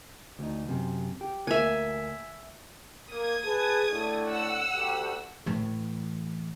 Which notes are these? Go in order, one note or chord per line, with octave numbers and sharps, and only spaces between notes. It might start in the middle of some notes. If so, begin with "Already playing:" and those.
D2 D#4
F#2 C3
G4
D2 A#3 E5 G#5
A#3 D#6 G#6
G#4 B4 A5
A2 D3 A3
F#5 E6
D2 G4
A2 E3